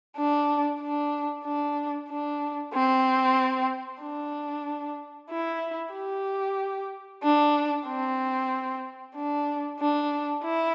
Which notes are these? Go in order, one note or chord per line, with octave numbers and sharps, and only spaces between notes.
D4
D4
D4
D4
C4
D4
E4
G4
D4
C4
D4
D4
E4